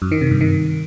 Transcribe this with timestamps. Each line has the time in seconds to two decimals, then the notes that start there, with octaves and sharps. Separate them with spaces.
0.02 F#2
0.11 D#3
0.21 C3
0.31 G2
0.41 D#3